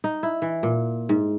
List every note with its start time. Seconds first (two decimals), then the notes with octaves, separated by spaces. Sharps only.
0.04 D#4
0.23 E4
0.42 E3
0.63 A#2
1.09 G#2